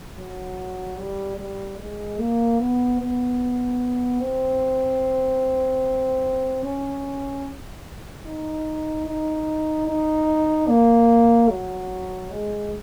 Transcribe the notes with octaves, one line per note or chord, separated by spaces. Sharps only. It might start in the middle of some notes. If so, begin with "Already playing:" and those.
F#3
G3
G3
G#3
A#3
B3
B3
C4
C#4
D#4
D#4
D#4
A#3
F#3
G#3